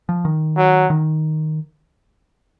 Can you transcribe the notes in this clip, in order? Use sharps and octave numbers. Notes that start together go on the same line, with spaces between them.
F3
D#3
F#3
D#3